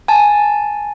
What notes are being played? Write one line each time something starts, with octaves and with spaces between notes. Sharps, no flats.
G#5 A5